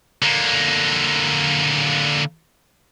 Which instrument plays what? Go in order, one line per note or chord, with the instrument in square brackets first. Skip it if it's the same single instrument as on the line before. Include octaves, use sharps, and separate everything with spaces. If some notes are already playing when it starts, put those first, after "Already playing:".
[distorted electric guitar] D3 A#3